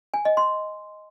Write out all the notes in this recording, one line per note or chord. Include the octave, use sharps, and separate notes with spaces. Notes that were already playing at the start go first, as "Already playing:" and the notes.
G#5
D#5
C6